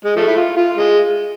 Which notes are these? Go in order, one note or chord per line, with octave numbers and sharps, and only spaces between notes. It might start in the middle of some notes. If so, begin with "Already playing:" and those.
G#3
F3 A3
E4
F4
F4
G#3